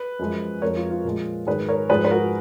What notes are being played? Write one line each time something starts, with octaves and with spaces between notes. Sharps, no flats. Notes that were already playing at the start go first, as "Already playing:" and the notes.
Already playing: B4
F#2 F3 G#3
F2 F3 G#3 A#4 C#5
F4
F4
A#2 F3 G#3
G#2 D#3 F#3 G#4 B4
A#4 C#5
G#2 F3 G#3 G#4 B4
B4
F#4 A#4